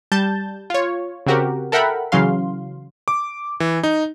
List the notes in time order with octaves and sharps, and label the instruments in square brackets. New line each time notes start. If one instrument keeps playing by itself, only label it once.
[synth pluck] G3 A5 G6 A6
F4 C#5
C#3 C4 F#4 G4 A#4
A4 A#4 E5 F#5 G5 B5
C#3 E3 F#3 C#4 F5 C6
[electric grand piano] D6
E3
D#4